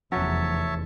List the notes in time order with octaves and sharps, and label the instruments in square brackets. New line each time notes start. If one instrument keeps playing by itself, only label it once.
[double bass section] F1 E2 [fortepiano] F#3 C#4 [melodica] C#5 E5 A5